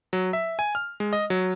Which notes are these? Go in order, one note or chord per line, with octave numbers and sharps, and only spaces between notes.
F#3
E5
G#5
F6
G#3
D#5
F#3